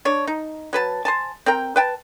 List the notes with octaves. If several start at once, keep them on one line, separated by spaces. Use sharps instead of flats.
D4 C#5
D#4
F#3 B4 A5
C5 G#5 A5
C4 A#4 G5
B4 G5 A5